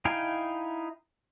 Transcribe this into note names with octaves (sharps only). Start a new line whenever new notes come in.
D#4 E4 F5 G5 G#5